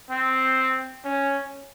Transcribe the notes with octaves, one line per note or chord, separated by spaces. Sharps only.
C4
C#4